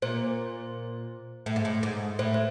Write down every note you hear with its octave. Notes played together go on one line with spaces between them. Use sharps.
A#2 C5
A2
G#2
A2
G#2
A2 C5
C5